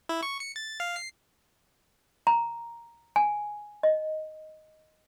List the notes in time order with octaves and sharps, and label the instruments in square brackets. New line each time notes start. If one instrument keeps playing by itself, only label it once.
[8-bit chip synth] E4
C#6
C#7
A6
F5
C7
[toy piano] A#5
G#5
D#5